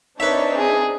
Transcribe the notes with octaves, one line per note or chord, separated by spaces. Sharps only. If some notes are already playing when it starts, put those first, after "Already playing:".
C4 D4 D#4 B4 C#5 E5
G#4